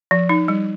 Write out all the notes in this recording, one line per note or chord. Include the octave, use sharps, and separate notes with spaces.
F3
D#4
G3